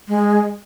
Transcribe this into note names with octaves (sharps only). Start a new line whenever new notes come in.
G#3